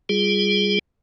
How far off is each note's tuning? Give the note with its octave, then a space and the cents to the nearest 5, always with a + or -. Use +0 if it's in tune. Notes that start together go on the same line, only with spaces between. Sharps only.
G3 +0 F4 +0 G#4 +0